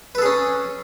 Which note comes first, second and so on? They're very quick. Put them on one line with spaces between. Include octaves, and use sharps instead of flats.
B4 A4 G#4 C#4